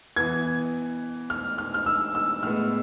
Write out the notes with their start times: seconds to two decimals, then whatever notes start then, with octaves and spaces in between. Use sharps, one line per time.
0.16 E3 B3 G#6
1.30 F6
1.58 F6
1.74 F6
1.86 E6
2.15 E6
2.43 A2 G#3 B3 F6